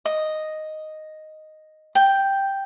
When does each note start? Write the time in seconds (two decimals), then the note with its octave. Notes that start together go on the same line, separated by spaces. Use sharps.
0.05 D#5
1.95 G5